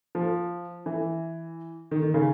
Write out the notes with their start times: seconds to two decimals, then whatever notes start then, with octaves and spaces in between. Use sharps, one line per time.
0.15 F3
0.86 E3
1.91 D#3
2.02 D#3
2.14 C#3